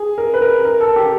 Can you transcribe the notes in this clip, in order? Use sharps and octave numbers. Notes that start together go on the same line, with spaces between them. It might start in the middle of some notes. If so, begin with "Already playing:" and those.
Already playing: G#4
A#4
B4
A#4
A#4
A4
G4